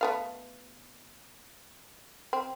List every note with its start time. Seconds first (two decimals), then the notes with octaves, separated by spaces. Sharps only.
0.01 A3 B3 F5
2.33 C4